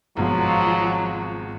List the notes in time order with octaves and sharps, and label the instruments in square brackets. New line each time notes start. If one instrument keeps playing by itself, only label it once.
[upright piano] G#1 B2 [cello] F3 [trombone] F#3